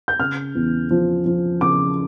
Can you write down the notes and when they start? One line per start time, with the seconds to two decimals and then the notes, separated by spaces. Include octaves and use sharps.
0.08 G6
0.19 C#3 F6
0.55 E2
0.91 F3
1.26 F3
1.61 C#3 D6